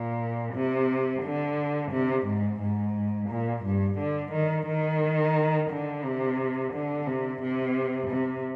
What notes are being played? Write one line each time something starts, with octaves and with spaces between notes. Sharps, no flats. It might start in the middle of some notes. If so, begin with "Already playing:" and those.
Already playing: A#2
C3
D3
C3
G#2
G#2
A#2
G2
D3
D#3
D#3
D3
C3
D3
C3
C3
C3